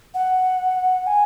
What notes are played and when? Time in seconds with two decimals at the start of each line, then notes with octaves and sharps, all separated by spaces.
0.14 F#5
1.07 G#5